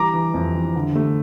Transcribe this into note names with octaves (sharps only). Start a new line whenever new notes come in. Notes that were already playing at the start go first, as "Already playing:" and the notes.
Already playing: E3 G3 A#5 D6
E3
F2
E3
D3
A3